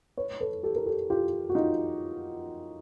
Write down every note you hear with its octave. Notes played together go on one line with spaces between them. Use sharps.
B4 C#5
A4 B4
G4 A4
A#4
G4 A4
F4 G4
F#4
D#4 F4